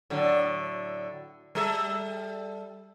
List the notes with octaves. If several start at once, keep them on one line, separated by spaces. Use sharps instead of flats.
A2 D3 F#3
G3 A4 E5